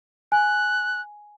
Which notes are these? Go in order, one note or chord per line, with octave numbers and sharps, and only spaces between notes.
G#5 F#6